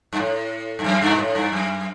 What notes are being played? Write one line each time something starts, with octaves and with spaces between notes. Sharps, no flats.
G2
A2
G2
F#2
G2
B2
A2
G2
F#2